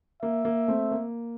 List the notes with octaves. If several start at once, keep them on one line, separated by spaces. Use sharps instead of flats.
A#3 E5
A#3
A3 C4
A#3